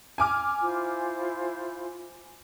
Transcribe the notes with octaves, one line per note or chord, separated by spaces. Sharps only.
G#5 D6 F6
E4 F4 C5